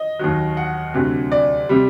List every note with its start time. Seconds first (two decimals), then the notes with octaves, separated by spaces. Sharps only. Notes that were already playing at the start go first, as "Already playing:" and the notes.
Already playing: D#5
0.19 D#2 D#3 F#3
0.57 F#5
0.94 D2 C3 F#3
1.32 D5
1.69 C3 G3